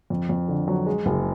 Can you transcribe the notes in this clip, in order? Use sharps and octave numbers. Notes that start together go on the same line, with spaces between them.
F2
F2
D3
F#3
G#3
F#1